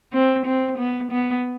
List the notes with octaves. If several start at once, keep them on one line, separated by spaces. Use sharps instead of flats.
C4
C4
B3
B3